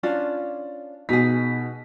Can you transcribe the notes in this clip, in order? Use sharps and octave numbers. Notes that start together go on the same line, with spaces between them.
C#4 D4 F4
B2 D#4 G#4 B6